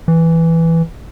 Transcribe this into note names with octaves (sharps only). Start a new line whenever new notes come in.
E3